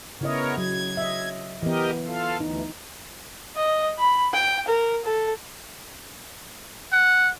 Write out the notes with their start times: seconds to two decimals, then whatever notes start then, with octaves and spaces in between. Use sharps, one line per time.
0.21 C#3 B3 E4 A#4 C#5 D#5
0.58 F#3 G#6
0.97 D#5 E5
1.63 E3 B3 G4 A#4 D#5
2.06 F4 A4 F5
2.40 D2 E3 D#4
3.56 D#5
3.99 B5
4.34 G5
4.68 A#4
5.05 A4
6.92 F#5